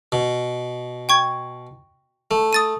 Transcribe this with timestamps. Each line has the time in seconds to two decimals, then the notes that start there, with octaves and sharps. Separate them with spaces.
0.12 B2
1.09 G5 C#6 G#6
2.31 A3
2.53 D#6 A6 D#7